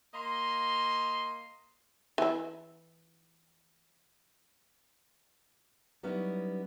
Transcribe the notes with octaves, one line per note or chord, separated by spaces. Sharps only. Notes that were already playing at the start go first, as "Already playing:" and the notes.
A#3 D#5 C6
E3 E4
F#3 G3 B3 C#4 D#4 E4